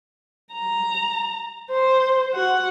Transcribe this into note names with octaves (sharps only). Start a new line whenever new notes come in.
A#5
C5
F#4 F#5